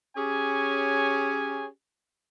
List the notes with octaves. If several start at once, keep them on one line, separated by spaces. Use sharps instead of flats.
C#4 G4 G#4 C#5 G#5